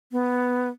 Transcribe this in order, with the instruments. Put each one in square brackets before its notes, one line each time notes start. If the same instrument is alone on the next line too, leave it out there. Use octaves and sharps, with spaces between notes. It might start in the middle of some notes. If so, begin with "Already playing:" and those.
[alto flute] B3